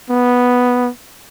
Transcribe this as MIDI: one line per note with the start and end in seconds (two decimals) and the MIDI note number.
0.10 0.90 59